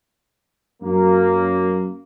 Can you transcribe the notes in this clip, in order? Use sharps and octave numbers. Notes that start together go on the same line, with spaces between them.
F#2 A#3